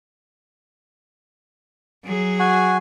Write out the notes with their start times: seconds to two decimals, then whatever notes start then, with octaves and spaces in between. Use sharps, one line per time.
2.05 F#3 G#4
2.39 F#4 G#5